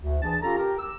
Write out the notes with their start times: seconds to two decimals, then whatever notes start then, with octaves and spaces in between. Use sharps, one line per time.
0.01 D2
0.22 E3 D4 G#4 A5
0.42 C#4 F4 G4 A4 A#5
0.57 G4 A#4
0.78 E6